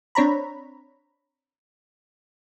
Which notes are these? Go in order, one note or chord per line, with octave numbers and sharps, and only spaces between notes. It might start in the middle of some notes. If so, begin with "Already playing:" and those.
C4 D4 C#5 A#5 B5